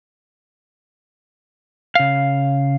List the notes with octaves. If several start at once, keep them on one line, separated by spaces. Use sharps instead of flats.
C#3 F5